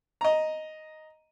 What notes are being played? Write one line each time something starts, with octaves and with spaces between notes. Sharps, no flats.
D#5 A#5